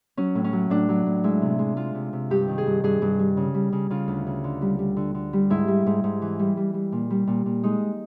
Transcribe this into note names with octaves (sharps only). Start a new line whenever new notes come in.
F#3 C#4
A2
C#4
F#3
A2 D4
F#3
A2
G#3 E4
C3
G#3
G#3 F4
C3
C3
G2 G4
D#3
G#4
G2
G2 G#4
G2
G3
C#3
G3
C#3
C#3 F4
D2
C#3
D3
G3
G3
D3
D3
G3
G#2 E4
G3
G#2
G#2
E3
G3
G3
G3
A#2
G3
A#2
A#2
G#3 D#4